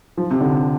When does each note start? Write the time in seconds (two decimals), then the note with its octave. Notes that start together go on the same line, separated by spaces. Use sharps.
0.17 F3
0.31 C3
0.41 D3